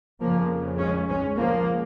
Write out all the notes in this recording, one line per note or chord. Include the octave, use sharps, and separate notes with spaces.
F2 C#3 F3 A#3
G#3 C#4
G#3 C#4
C#2 C#3 F3 A#3